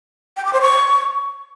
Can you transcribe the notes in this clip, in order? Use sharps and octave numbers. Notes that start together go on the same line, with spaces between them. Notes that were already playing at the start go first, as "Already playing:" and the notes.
G5
D6
C5
C#6